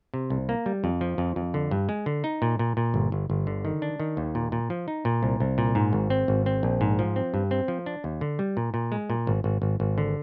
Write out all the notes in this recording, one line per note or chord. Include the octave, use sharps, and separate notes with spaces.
C3
C2
A#3
G3
F2
F3
F2
F2
D3
G2
G#3
D3
D#4
A#2
A#2
A#2
G1
G1
G1
D3
D#3
D4
D#3
D#2
A#2
A#2
F3
D#4
A#2
C2
C2
A#2
G#2
G#1
C4
G#1
C4
A#1
G#2
F3
C4
G2
C4
F3
D4
D#2
D3
G3
A#2
A#2
G#3
A#2
G#1
G#1
G#1
G#1
D3